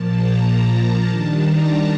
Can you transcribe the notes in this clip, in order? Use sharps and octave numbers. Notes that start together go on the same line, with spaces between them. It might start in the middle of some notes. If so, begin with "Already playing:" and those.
Already playing: A#2 F3 A#3 A5
A#5
D#3 G3 D4 A5
A#5